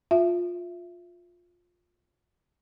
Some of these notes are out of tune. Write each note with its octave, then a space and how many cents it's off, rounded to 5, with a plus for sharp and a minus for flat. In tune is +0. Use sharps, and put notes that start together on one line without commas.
F4 +15 E5 +20